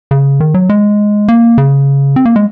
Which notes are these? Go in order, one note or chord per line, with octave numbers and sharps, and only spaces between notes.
C#3
D#3
F#3
G#3
A#3
C#3
C4
A#3
G#3